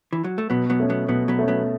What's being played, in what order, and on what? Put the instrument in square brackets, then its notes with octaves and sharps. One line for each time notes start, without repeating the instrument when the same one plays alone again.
[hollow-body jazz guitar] E3
F#3
A3
[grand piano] B2 [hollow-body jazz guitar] F#3 B3
[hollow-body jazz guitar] F#3 B3
[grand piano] A3 C#4
[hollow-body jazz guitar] F#3 B3
[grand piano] B2 [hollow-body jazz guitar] F#3 B3
[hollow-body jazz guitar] F#3 B3
[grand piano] A3 C#4
[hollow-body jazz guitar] F#3 B3